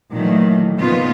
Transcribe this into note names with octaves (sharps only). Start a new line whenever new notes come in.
A#2 D#3 E3 F#3 A3
A#2 C#3 F3 B3 D#4 F4